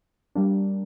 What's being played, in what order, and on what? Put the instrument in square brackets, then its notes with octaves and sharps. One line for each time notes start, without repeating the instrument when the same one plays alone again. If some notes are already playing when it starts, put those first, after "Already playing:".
[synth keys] G3 A#3 D4